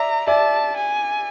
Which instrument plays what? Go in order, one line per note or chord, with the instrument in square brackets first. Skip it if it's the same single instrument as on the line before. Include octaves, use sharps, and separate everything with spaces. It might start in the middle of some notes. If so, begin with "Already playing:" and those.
Already playing: [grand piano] D5 E5 [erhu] A#5
[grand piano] D5 E5 [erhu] A5
[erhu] G#5